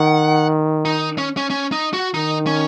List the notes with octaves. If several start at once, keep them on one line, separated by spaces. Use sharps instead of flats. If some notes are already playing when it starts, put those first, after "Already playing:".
Already playing: D#3 F#5
D#4
C#4
C#4
C#4
D#4
F#4
D#3 D#4
C#4